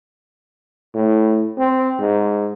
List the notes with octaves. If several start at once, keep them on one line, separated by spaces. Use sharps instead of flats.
A2
C4
G#2